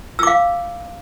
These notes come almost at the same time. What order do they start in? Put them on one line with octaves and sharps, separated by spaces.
E6 D6 F5